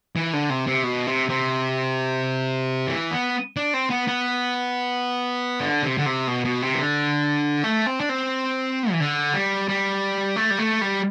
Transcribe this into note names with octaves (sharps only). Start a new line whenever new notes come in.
E3
D3
C3
C3
B2
C3
C3
E3
B3
D4
C4
B3
B3
D3
C3
D3
C3
B2
B2
C3
E3
D3
A3
C4
D4
C4
E3
D3
G3
G3
A3
G3
A3
G3